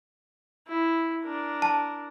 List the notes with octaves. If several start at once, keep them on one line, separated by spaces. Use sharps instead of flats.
E4
D4 A#4
A5